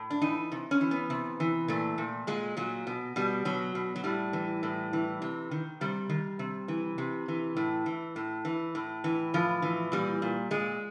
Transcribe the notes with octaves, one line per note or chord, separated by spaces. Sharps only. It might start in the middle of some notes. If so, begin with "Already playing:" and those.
Already playing: A2
D4
E3 D#4
C3
C#4
E3
B3
C3
E3
A#2 A3
A#2
A#2 G#3
A#2 F#3
B2
B2 G3
B2 F#3
B2
F#3
A2 G3
E3
A2
E3
C3
D#3
C3 G3
D#3
C3
E3
C3
E3
A2
E3
A2
E3
A2
E3
A2 F3
E3
A#2 G3
A#2
A#2 G#3